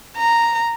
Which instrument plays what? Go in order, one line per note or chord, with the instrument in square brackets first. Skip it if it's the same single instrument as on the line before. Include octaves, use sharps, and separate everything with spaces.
[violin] A#5